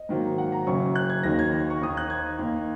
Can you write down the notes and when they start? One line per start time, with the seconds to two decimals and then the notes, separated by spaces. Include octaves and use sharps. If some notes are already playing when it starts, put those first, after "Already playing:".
Already playing: D#5
0.09 G#2 D#3 F#3 A#3
0.38 F#5
0.52 A#5
0.67 F#1 F#2 C#3 C#6
0.95 F#6
1.10 G#6
1.23 D#2 D#3 F#3 A#3 D#4 A#6
1.39 G#6
1.70 C#6
1.82 D#2 D#3 A#3 D#4 D#6
1.97 F#6
2.10 G#6
2.39 D#2 D#3 A#3 D#4